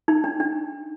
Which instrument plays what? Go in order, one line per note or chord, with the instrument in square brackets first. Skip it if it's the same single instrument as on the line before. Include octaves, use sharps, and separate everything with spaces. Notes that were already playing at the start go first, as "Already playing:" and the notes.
[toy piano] D#4
D4
D4